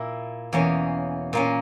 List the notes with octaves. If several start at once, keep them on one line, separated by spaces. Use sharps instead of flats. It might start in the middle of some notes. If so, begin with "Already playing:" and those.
Already playing: A#2 A#3 E4
E2 B2 A#3 C#4
A#2 A#3 C#4